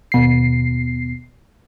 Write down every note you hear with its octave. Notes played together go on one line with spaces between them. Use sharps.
D#2 B2 C7